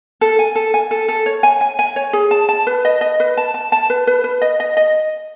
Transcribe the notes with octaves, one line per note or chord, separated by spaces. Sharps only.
A4
G#5
A4
G#5
A4
A4
C#5
G#5
G#5
G#5
C#5
G#4
A5
A5
B4
D#5
D#5
B4
A5
A5
A5
B4
B4
B4
D#5
D#5
D#5